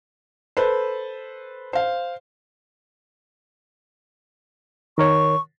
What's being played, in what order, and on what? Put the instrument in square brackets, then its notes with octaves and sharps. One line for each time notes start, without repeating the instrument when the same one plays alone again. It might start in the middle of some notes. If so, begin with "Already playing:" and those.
[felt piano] A4 B4 C5
C5 F5
[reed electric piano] D#3 A#4 C#5 [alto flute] C#6